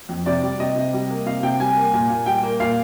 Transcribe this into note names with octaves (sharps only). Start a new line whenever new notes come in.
F2
C3 D5
G3
C3 D#5
C3
G3
A#3
C3 F5
C3 G5
G3 G#5
A#3
A#2
A#2
G3 G5
A#3
A#2 F5